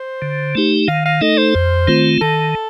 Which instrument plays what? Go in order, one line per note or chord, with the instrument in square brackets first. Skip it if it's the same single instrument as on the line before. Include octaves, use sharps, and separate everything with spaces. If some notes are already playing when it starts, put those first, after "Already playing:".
Already playing: [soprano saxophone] C5
[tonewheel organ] D3
A3 D#4 G4
[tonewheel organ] D#3 [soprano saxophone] F5
[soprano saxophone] F5
[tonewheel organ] A3 D#4 A4 [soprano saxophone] D#5
[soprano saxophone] C5
[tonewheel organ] F2
D#3 A3 C4 F4
[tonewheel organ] D#3 [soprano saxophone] A4